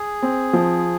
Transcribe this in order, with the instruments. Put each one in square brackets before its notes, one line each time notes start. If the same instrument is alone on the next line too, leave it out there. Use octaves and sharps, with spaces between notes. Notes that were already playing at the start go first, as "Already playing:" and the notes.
Already playing: [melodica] G#4
[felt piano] C4
F3